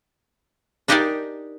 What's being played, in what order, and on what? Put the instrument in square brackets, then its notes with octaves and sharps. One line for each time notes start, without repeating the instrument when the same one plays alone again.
[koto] D4 D#4 G4 G#4 A#4 D5